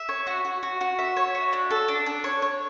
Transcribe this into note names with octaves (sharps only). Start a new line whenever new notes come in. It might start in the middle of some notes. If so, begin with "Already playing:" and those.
Already playing: E5
C#5
F#4
F#4
F#4
F#4
E5
C#5
F#4
D4
A4
D4
D4
C#5
C#5